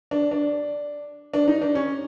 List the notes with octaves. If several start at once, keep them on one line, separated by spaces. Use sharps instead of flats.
D4
D4
D4
D#4
D4
C#4